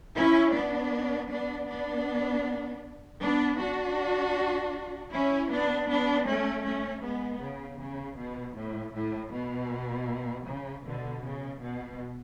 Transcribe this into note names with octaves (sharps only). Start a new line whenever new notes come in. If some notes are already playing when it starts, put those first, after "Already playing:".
C#4 E4
B3 D4
B3 D4
B3 D4
B3 D4
D4 F#4
C#4 E4
B3 D4
B3 D4
A3 C#4
A3 C#4
G#3 B3
C#3
C#3
B2
A2
A2
B2
C#3
B2 D3
C#3
B2